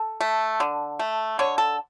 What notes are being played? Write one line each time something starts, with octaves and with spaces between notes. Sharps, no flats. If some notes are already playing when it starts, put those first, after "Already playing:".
Already playing: A4
A3
D3
A3
D3 C#5
A4